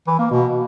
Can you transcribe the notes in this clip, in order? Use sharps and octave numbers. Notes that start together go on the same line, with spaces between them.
E3
A#3
B2